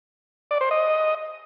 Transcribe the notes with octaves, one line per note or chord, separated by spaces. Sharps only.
D5
C5
D#5